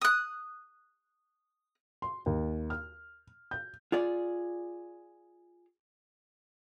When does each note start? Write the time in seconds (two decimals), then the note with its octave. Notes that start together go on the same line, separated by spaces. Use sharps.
0.02 D#6 F#6
2.02 C6
2.26 D#2
2.70 F6
3.51 G6
3.92 F4 G#4 D5